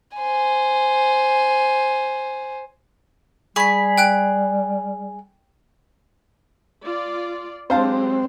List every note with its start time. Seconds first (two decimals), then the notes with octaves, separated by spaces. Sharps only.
0.17 C5 G#5
3.56 G3 G#4 B5 C#6 B6
3.98 G5 F#6 D7
6.82 F4 D5
7.70 F#3 G#3 C4 G4 C5 F5 A5